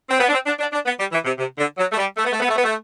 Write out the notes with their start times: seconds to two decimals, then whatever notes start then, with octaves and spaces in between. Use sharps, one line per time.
0.10 C4
0.20 B3
0.29 D4
0.33 C4
0.46 D4
0.59 D4
0.72 D4
0.86 B3
0.99 G3
1.12 E3
1.25 C3
1.38 C3
1.58 D3
1.78 F#3
1.92 A3
1.97 G3
2.17 A3
2.25 B3
2.33 A3
2.40 B3
2.49 A3
2.56 B3
2.64 A3